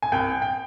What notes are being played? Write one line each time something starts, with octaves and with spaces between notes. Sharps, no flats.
G#5
C2 G5
G5